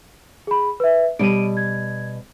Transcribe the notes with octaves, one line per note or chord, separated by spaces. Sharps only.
G#4 B5
B4 E5
B2 G3 C#5 D7 D#7
G#6